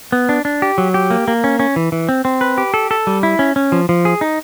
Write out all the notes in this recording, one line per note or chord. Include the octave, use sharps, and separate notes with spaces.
B3
D4
D4
G4
F#3
G4
A#3
A#3
C#4
C#4
E3
E3
C4
C4
B4
G4
A4
A4
G3
E4
C#4
C#4
F3
F3
G#4
D#4